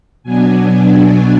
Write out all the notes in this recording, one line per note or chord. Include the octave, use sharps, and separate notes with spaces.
B2 F#3 B3 D4 G#5
G#5